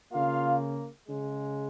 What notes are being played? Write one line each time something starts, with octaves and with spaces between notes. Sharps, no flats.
C#3 A#3 F4 F5
C#3 G#3